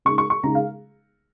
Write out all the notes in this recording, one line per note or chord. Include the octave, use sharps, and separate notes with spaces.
C#3 G#3 D#4 C#6
C#6
C#6
C#3 G#3 D#4 A#5
F5